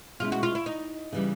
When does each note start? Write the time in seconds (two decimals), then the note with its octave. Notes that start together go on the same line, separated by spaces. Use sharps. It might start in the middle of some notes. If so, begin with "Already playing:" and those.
0.20 B2 G#3 C#4 E4 F4
0.32 F#4
0.43 F4
0.55 E4
0.66 D#4
1.12 C#3 E3 G3